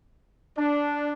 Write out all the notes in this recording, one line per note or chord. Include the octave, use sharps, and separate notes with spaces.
D4